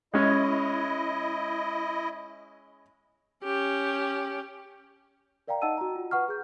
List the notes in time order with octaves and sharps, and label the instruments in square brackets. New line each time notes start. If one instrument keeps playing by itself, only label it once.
[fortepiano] G#3 C#4 [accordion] E4 D#5
[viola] C#4 G4
[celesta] A#4 D5 F5 G5 A#5
D#4 D#5 F#5 A5 E6 D#7
F#4 A#5
F4
B4 F#5 C#6 F6
G#4 G6